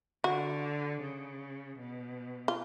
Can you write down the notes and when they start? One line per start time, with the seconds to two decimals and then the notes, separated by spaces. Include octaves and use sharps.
0.24 D3 F#4
1.01 C#3
1.78 B2
2.48 F4